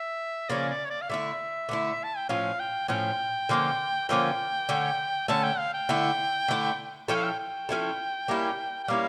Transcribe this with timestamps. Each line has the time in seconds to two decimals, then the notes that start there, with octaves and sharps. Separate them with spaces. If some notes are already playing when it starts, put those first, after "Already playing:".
Already playing: E5
0.49 C#3 F3 A#3 C#4 D5
0.70 D5
0.85 C#5
0.90 D5
1.02 F5
1.09 D3 A3 E4 E5
1.69 D3 A3 E4
2.04 A5
2.17 G5
2.29 A2 F3 C#4 F5
2.60 G5
2.88 A2 F3 C#4 G5
3.49 D3 F3 A#3 C#4
4.08 D3 F3 A#3 C#4 G5
4.69 D3 A3 C#4
5.28 D3 A3 C#4 A5
5.43 G5
5.58 F5
5.74 G5
5.89 D3 A3 E4
6.48 D3 A3 E4
7.08 F3 C#4 E4 A4 G5
7.16 F5
7.23 G5
7.39 G5
7.69 F3 C#4 E4 A4
8.28 G3 A#3 C#4 E4
8.84 G5
8.88 G3 A#3 C#4 E4 F5